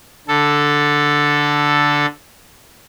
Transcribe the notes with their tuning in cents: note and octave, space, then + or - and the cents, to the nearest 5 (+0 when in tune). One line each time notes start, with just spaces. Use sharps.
D3 +0 A4 +0